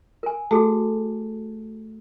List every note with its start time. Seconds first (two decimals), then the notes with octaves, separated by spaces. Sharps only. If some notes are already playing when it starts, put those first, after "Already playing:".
0.23 A#4 G#5
0.51 A3 F#4 G#4 A4